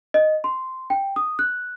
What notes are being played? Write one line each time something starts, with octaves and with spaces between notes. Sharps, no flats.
D#5
C6
G5
D#6
F#6